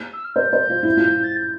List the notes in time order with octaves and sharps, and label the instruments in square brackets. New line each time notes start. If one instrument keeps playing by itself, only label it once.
[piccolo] E6
F6
[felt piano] C5 [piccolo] G6
[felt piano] C5
F4
E4
F4
[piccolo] A6
G6